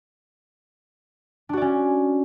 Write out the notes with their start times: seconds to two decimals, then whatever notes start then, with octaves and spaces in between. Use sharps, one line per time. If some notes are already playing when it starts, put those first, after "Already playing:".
1.49 D4
1.53 F#4
1.57 D5
1.62 C#4